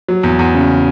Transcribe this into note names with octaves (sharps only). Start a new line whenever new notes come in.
F#3
E2
E2
C#3